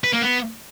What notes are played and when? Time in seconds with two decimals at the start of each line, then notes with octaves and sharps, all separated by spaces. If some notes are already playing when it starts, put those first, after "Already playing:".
0.04 B4
0.13 A#3
0.22 B3